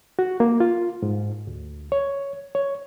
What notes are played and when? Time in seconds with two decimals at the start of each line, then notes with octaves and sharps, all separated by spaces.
0.19 F#4
0.40 A#3
0.60 F4
1.02 G#2
1.47 D2
1.92 C#5
2.55 C#5